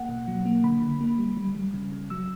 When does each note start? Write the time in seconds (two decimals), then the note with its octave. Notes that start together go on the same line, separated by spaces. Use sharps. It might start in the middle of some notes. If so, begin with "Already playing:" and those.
Already playing: A#3 F#5
0.09 B2
0.27 F#3
0.46 A#3
0.64 D3 B5
0.82 D3
1.01 A#3
1.18 G3
1.37 G3
1.55 G3
1.74 C#3
1.92 C#3
2.10 F#3 E6